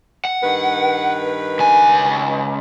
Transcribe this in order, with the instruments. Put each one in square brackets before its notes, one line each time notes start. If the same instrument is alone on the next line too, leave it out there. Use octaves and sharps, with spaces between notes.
[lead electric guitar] F#5
[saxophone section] G2 D#3 B4
[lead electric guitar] C#2 G#5